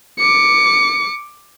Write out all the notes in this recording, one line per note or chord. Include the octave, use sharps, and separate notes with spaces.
D6 C#7